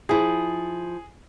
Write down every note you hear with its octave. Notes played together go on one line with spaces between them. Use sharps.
F3 E4 G#4